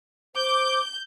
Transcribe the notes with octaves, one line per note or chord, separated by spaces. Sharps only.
C5 D6 G6